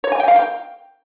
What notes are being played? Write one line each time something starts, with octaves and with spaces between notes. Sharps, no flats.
C#5
G#5
G5
F5
G5